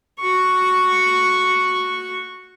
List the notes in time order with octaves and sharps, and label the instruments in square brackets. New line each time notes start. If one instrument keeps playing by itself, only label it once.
[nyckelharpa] F#4 C#6